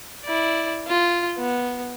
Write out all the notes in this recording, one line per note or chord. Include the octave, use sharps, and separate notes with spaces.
E4 D5
F4
B3